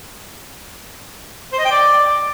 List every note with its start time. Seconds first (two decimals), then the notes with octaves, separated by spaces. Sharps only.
1.52 C5
1.59 D#5
1.65 G5
1.71 D5